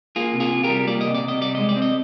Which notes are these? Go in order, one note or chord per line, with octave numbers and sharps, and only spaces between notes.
A#3 F4 G#4
C3
F4 G#4
C3
G4 A#4
G3
A#3 D5
C3 D#5
D5
C3 D#5
G3 D5
G#3 D#5
D5
C4
D#5